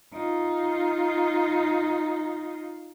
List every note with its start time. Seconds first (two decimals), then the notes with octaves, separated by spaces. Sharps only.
0.13 D#4 F4